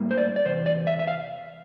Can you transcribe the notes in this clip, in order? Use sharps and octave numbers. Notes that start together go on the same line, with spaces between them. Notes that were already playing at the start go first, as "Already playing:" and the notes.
Already playing: A2 G3 A#3
C5
D5
D5
E2 C3 C5
D5
E5
E5
F5